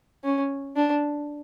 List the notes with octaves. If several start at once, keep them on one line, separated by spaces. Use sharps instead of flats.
C#4
D4